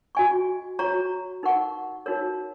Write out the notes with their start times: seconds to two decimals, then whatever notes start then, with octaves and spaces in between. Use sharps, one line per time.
0.15 F#4 D#5 G#5 C#6
0.79 F#4 C#5 A#5 C#6
1.43 D#4 A#4 F#5 C#6
2.06 D#4 F#4 A#4 C#5